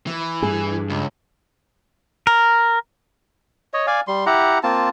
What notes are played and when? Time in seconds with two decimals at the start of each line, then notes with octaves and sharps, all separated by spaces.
0.07 E3
0.42 G2 G#4
0.90 C#2
2.27 A#4
3.74 C#5 D#5
3.87 D5 F5 G#5
4.08 G3 C6
4.26 E4 G4 F#5 A#5
4.63 A#3 C4 F4 A5